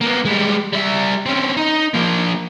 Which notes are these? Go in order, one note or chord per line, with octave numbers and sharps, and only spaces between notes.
A#3 B3
G3 G#3
G3 E5
C4 C#4
D#4
F3 A#3